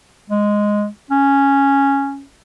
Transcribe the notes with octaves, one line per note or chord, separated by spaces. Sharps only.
G#3
C#4